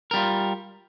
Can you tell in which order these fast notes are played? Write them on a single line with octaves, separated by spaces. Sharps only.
A#4 G3 F4